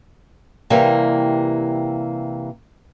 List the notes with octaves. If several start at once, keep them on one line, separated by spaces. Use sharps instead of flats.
C3 E3 G3 A#3